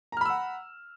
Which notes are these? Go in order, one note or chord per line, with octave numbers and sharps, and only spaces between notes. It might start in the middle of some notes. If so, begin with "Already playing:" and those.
F#5 A#5 B5 E6 F6